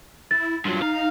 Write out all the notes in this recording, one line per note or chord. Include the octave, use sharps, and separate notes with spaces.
E4 A6
G2 F#3 F4
D#4 F5